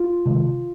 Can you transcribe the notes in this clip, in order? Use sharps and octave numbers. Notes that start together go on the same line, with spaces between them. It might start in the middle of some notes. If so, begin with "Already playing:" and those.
Already playing: F4
C3 D#3 G#3